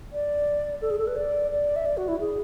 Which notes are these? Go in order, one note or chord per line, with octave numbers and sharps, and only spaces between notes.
D5
A4
G#4
A4
B4
D5
D5
E5
D5
F#4
E4
G#4